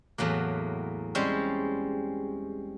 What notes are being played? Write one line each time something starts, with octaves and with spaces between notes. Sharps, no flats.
E2 A2 F#3 A#3
G3 G#3 C4 C#4